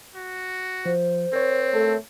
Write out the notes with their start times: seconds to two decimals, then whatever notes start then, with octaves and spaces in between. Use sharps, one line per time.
0.15 F#4
0.86 F3 C5
1.33 C4 A#4 C#5
1.74 A3 A4